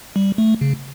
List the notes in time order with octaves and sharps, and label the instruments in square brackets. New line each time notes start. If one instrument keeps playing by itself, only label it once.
[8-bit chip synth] G3
A3
C#3